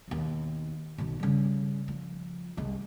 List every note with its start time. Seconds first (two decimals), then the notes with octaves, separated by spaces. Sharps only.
0.08 D#2 B2
0.98 B1 D#3
1.20 C#3 G3
1.88 F3
2.57 C2 G#3